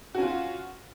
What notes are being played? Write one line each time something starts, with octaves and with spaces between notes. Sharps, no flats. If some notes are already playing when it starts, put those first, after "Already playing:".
C#4 F4 F#4